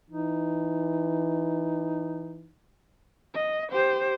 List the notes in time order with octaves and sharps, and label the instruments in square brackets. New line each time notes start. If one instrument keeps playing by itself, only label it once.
[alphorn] E3 [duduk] D#4
[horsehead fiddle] D#5
G4 C5